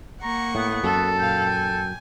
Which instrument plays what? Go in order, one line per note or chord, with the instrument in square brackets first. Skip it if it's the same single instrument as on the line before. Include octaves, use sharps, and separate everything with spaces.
[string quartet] A#3 F#5 C#6 [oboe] A#5
[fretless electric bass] A2 [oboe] B3
[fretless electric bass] F#2 [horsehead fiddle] A4
[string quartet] A#2 F5 [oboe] G5
[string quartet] G#5